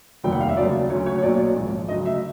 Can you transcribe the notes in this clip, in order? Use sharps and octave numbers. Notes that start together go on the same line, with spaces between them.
F1 D#2 D#3 G3 G5
F#5
F5
E5
D#2 C#3 F#3 D5
D2 C#3 F#3 C#5
C#5
C#5
B1 A#2 F#3 D5
G#1 G#2 F3
D2 C#3 F#3 D#5
E5